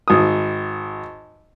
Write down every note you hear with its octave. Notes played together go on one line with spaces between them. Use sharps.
G#1 D#6